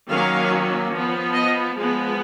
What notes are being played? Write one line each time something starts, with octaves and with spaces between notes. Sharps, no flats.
D#3 F#3 A#3 C#4 F5
F3 B3
D#5
F3 G#3 B3